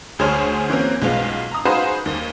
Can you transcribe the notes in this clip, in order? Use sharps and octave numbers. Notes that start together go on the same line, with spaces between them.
D2 G#4 C5 C#5 G#5 F6
E3 A#3 C4 C#4
B1 G#3 B3 F4
A#5 D#6
D#4 F#4 G#4 B4 C5 F5
D#2